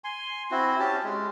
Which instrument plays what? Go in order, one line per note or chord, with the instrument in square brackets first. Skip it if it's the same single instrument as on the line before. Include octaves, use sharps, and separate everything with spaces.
[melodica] G#5 C6
C4 E4 F#4
C#4 G4 A5
G#3